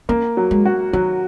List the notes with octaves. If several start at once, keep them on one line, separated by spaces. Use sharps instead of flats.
A#3 C#4
F#3
G#3
F#4
D#3 F#3